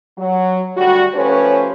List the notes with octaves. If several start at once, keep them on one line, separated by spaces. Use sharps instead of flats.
F#3
D2 G3 F#4
F3 A3 C#4 G4 B4 C#5